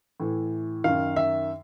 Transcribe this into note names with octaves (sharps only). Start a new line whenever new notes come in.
A2 E3
F#2 D#3 F5
E5